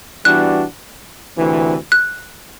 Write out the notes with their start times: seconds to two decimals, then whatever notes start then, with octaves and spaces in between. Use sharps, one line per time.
0.25 E3 G3 B3 D4 F#4 F#6
1.37 D2 C3 E3
1.92 F#6